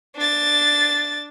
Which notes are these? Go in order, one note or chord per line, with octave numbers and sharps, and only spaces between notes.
D4 A6